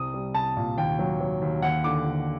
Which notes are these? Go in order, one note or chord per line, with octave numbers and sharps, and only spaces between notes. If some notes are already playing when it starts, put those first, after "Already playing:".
Already playing: C2 D#6
G3
C2 A5
A#2
D#2 G5
F#3
F#3
D#2
D#2 F#5
D3 D6
D3